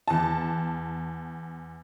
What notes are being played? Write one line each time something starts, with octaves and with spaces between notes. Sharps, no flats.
E2 A5